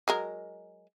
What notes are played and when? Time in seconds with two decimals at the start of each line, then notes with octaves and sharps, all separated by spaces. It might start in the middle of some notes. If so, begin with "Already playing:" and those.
0.08 F#3 G#3 A#4